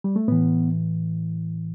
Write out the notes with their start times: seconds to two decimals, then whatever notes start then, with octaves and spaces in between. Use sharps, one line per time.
0.04 G3
0.16 A3
0.28 A2 E3 B3